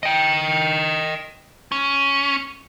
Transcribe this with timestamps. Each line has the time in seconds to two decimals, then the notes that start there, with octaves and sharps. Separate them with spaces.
0.03 D#5 G5
1.72 C#4